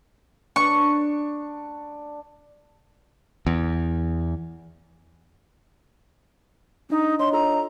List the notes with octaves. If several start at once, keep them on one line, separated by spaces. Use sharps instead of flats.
D4 C#6
E2
D4 D#4 D#5 A#5
D4 C#5 D#5 C6
F4 A4 A#5 E6